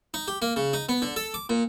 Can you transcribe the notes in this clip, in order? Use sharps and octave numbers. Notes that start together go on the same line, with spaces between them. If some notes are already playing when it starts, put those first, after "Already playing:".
D#4
G4
A#3
C#3
D#4
B3
D3
A4
D6
A#2